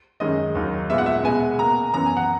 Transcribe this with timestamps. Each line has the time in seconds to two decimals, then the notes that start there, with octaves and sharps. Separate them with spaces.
0.20 F#2 D#3 G#3 D#5
0.55 D#2 D#3 F#3
0.90 A#2 G#3 B3 E5
0.98 F#5
1.06 E5
1.24 B2 G#3 B3 G#5
1.59 B2 A#3 A#5
1.94 F#2 E3 B3 A#5
2.06 G#5
2.17 F#5